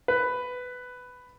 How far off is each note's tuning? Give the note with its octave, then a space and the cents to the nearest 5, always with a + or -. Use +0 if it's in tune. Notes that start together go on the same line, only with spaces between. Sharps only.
B4 +10